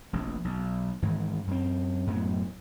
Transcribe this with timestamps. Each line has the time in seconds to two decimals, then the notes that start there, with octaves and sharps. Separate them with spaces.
0.13 F1 A#1
0.45 B1
1.03 G#2 D#3 E3
1.47 F#2 C4
2.07 F#2 A2 F#3 B3